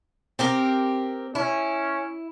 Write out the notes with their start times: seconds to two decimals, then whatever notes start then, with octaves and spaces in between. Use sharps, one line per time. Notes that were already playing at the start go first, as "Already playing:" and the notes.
0.39 C4 G4 A#4
1.35 C#4 E4